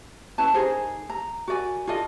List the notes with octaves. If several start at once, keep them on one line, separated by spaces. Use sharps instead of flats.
C#4 E4 B4 A5
D#4 G#4 A#4 C5
A#5
F#4 A#4 D5 G#5
F4 A4 D5 D#5